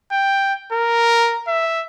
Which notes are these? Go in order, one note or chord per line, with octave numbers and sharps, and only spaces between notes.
G5
A#4
E5